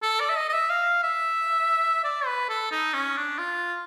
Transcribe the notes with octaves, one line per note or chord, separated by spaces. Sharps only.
A4
D5
E5
D#5
D#5
E5
F5
E5
D5
B4
A4
D#4
C#4
D4
F4